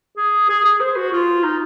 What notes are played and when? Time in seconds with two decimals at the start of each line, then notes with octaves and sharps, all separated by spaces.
0.17 G#4
0.49 G#4
0.65 G#4
0.80 C5
0.96 F#4
1.12 F4
1.43 D#4